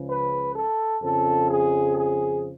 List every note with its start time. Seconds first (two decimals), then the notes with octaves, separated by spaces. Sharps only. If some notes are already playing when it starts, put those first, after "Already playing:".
Already playing: C#2 C#3 F3
0.08 B4
0.55 A4
1.02 F2 C#3 F3 A4
1.49 G#4
1.96 G#4